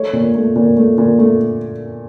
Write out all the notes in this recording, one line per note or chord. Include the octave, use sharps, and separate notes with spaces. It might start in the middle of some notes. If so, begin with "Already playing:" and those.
Already playing: A3 C#5
A#2
A3
A#2
A3
A#2
A3